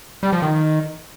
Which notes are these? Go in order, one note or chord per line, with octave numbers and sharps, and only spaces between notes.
G3
F3
D#3